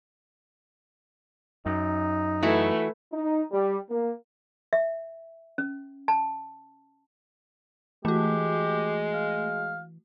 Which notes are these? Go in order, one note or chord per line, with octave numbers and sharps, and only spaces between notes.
F#2 D#4
E3 A3 E4 F#4 B4
D#4
G3
A#3
E5
C#4
A5
E3 G#3 A3 F#4 G4
F5